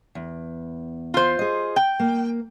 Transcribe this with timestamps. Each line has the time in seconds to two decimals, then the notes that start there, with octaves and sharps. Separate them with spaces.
0.15 E2
1.14 F4 C5
1.39 G#4 D#5
1.76 G5
2.00 A#3